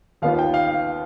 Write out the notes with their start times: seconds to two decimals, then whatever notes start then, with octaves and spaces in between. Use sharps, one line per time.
0.22 D#2 D#3 B3 F4 F5
0.39 G5
0.54 F5
0.71 F5